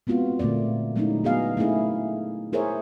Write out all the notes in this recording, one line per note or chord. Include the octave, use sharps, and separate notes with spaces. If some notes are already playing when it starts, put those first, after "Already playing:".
G#3 B3 C4 F4 F#4
A#2 D3 A3 A#3 D5
F#3 G#3 A3 C#4 D#4 E4
B3 F#4 G#4 D#5 F5
A3 A#3 C#4 D#4 E4 G#4
E4 G#4 A#4 C5 C#5 E5